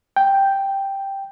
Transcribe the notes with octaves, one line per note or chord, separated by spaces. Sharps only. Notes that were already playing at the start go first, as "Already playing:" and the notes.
G5